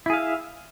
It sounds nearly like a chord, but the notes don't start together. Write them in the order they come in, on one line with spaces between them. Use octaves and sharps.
E4 G#4 F5 E5